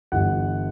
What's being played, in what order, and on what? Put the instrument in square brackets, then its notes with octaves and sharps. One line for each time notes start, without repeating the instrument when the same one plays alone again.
[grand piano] G1 G2 E3 G3 F#5